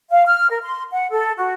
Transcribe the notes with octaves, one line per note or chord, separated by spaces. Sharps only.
F5
F6
A#4
C6
F#5
A4
F#4